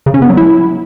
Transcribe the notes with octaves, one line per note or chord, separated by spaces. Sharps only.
C#3
C#4
B3
F#3
E4